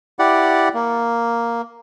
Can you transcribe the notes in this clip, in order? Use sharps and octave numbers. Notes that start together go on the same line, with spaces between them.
E4 G4 D5 F#5
A#3